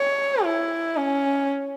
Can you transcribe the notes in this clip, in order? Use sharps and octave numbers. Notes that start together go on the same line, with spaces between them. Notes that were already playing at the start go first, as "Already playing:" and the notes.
Already playing: C#5
E4
C#4